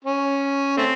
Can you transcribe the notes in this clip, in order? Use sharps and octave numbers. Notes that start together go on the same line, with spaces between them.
C#4
A3 C4